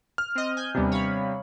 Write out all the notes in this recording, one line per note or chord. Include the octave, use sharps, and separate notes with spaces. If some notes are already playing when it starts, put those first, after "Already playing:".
F6
C4 D#5
G#5 G6
D#2 C3 G3 B3 D4
C#5 F5 B5